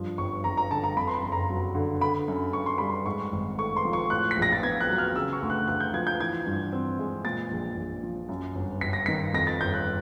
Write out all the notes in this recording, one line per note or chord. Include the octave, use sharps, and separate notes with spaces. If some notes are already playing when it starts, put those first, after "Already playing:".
Already playing: G2 F3
G1 C#6
G1 A#5
A#5
D3 A5
A#5
F2 B5
C6
B5
F#1
A#5
F#3
D3
D3 B5
F#2
F#2 C#6
C6
G3 B5
C6
G#2 C#6
G#1
A3 C#6
C6
F3
C#6
A2 F#6
B6
A#1
A#6
A6
B3 G#6
F#6
F#3
F6
C#3 E6
C#6
D2
F#6
D2 F#6
G6
F3 G#6
G6
E3 G#6
G2
C4
G#3
A#2 A6
A#1
A#1
F3
F#2
G1
G1 B6
A#6
D#3 B6
F2 A#6
A6
G1 G6
F#6